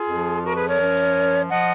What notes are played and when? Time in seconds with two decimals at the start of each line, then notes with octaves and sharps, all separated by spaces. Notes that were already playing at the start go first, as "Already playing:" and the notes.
Already playing: F4 G#4
0.09 F2 F3
0.44 F#4 A#4
0.55 G#4 B4
0.68 A#4 C#5
0.80 F#2 F3
1.49 F3 D#5 F#5